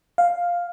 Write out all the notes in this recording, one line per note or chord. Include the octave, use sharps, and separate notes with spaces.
F5